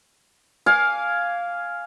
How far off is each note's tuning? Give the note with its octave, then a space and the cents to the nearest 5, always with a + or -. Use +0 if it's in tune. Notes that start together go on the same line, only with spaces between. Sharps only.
F5 +0 G#5 +0 D6 -20